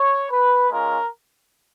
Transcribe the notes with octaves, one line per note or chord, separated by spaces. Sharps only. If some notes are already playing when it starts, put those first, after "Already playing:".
Already playing: C#5
B4
G#3 C#4 F4 A#4